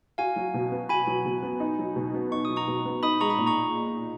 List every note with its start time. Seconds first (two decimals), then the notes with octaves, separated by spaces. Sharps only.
0.18 F#4 F5 G#5
0.36 F#3
0.54 B2
0.72 B3
0.89 F#4 G#5 B5
1.07 F#3
1.25 B2
1.43 B3
1.60 D#4
1.79 F#3
1.96 B2
2.14 B3
2.31 D#4 C#6
2.45 F#3 D#6
2.56 A#5 C#6
2.67 B2
2.85 B3
3.03 D#4 B5 D#6
3.21 G#3 A#5 C#6
3.30 B5 D#6
3.38 A#2
3.47 A#5 C#6